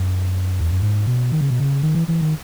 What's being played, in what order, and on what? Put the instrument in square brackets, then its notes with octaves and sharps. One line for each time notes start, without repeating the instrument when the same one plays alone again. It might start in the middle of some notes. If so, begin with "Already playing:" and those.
Already playing: [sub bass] F#2
E2
F#2
G#2
B2
D#3
C#3
B2
C#3
D#3
E3
E3
D#3